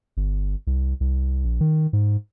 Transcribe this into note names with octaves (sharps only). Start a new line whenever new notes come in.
G1
C2
C2
A#1
D#3
G#2